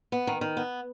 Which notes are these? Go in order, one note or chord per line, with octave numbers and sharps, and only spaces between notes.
B3
D#3
D#3
B3